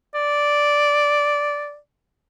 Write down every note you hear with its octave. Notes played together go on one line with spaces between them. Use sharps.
D5